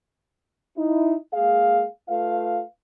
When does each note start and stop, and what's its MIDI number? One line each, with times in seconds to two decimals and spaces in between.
0.77 1.14 63
0.77 1.14 64
1.33 1.83 56
1.33 1.83 58
1.33 1.83 68
1.33 1.83 77
2.09 2.61 57
2.09 2.61 65
2.09 2.61 71
2.09 2.61 77